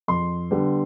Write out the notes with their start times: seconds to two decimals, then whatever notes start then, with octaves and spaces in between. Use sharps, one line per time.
0.08 F2 C6
0.51 D3 G3 B3